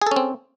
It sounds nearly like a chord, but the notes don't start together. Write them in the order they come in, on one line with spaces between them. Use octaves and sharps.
G#4 A4 C#4 C4